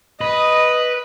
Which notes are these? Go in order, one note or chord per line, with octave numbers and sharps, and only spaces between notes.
B4 D#5